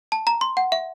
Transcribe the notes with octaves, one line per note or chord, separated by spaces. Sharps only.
A5
A#5
C6
F#5
E5